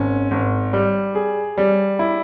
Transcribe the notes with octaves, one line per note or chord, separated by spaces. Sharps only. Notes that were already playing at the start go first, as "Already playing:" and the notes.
Already playing: G#1 C#4
G#1
G3
G#4
G3
E4